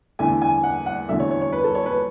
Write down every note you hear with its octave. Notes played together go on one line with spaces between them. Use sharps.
E2 D3 A3 G#5
G#5
F#5
F#5
E2 D3 F#3 A3 E5
C#5
C#5
C#5
B4
A4
C#5
B4